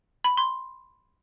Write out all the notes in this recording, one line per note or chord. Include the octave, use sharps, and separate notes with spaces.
B5
C6